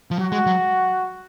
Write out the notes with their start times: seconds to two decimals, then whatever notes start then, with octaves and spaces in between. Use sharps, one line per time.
0.11 F3
0.19 F#3 F#4
0.32 G#3
0.46 F#3